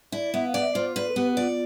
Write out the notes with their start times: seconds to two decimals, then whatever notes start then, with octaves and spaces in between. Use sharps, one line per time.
0.12 E4 D5
0.34 B3 E5
0.47 F5
0.54 D5
0.61 E5
0.75 F4 C5
0.96 B4 D5
1.08 A4
1.16 B3 G4
1.37 F4 D5